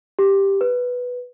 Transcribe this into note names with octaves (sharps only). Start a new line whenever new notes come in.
G4
B4